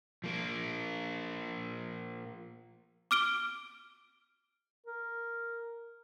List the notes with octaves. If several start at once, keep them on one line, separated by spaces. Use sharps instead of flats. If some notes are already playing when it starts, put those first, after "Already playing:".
F3 A#3
D6 F6 D7 G7
A#4